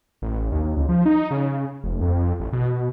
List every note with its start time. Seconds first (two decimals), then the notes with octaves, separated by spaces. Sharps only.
0.22 A1
0.52 D#2
0.76 C#2
0.89 F3
1.06 D#4
1.31 C#3
1.84 F1
2.01 F2
2.40 A1
2.53 B2